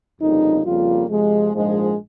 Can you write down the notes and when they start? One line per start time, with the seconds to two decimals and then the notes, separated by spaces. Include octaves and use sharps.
0.20 G1 F2 C#3 G3 A#3 D#4
0.65 F2 C#3 G3 A#3 F4
1.08 F2 C3 F3 G#3
1.52 A#1 G#2 F3 G#3